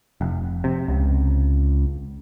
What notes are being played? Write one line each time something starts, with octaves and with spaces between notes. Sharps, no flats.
F1
C3
C#2